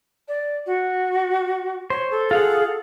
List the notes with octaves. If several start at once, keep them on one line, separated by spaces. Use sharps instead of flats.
D5
F#4
C5 C#5
A4
F4 G#4 F5 F#5